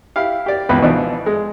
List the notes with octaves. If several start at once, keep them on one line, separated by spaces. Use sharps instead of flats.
E4 G4 F5
G4 D5
C#2 B2 E3 B4 B5
B2 E3 F3 D4 D#4
G#3